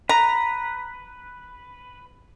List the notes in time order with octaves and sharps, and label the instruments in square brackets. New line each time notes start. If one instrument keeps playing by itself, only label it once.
[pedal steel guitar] B4 [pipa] A#5